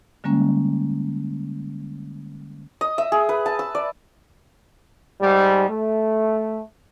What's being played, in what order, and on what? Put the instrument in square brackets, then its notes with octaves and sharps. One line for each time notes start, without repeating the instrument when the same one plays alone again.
[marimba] D3 G3 G#3 A#3 C#4
[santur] D#5
E5
G#4
B4
A5
E6
D5
[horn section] G#2 G3
A3